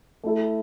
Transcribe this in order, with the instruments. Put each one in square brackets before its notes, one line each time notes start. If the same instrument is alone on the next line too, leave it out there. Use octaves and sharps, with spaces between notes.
[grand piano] A3 E4 A4